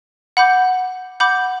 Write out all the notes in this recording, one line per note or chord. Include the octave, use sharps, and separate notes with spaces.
F#5 B5 D6 G6
F#5 B5 D6 G6